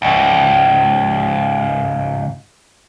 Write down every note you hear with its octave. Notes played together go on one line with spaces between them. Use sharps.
C#2 G#2